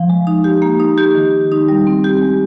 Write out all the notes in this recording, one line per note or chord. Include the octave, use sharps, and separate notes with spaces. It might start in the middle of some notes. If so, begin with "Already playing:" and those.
Already playing: F3
G#3
D#4
G4
A#3
D#4
G4
D#3
G#3
D#4
G3
C4
G4
G#3